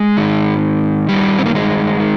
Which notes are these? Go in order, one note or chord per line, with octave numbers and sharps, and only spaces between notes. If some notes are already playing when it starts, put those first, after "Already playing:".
Already playing: G#3
G#2 D#3
G2 D#3 G3
C4
A#3
G#3
D#3